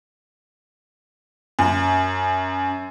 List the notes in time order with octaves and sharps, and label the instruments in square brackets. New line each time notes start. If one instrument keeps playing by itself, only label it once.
[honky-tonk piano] F#2